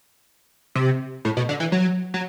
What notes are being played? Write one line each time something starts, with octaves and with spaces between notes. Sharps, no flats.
C3
A2
B2
D3
E3
F#3
F#3